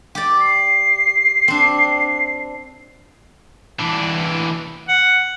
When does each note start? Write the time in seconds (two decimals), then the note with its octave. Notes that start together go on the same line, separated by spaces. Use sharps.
0.15 G4 D5
0.41 C7
1.48 C4 D4
3.80 E3 D4
4.89 F#5